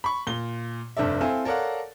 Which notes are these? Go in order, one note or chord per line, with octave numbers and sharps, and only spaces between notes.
B5 C#6
A#2 G7
F1 G2 A4 D5 E5
C4 E4 A4 F5 G#5
A4 A#4 C#5 D5 F5 F#5